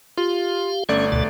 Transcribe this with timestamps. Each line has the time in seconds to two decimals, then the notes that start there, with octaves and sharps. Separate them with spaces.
0.18 F4 G4 F5
0.89 G1 A3 C#4 D5
1.12 D2 B2 A4